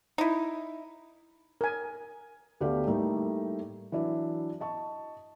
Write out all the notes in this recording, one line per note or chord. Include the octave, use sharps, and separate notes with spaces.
D#4 E4
A#4 G#5
D2 B3 G4 A4 D5 F5
A2 G3 A3 A#3 D#4
E3 F#3 D4 E4
D#5 A5 C#6